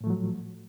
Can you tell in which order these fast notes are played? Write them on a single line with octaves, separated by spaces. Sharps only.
A2 A3 F3 F#3